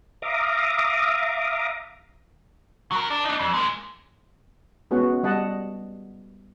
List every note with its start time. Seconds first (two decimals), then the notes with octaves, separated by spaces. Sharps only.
0.22 E5 F5 A#5 D6 D#6
2.91 F#3 A#4
3.10 D4
3.25 D4 D#4
3.40 F2
3.54 G#3 A#3
4.91 G#3 B3 C#4 F#4 F#5
5.23 G3 D#5 F#5 A5